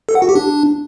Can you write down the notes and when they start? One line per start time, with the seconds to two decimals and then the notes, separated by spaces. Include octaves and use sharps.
0.09 A4
0.15 F#5
0.22 F#4
0.29 G4
0.35 D4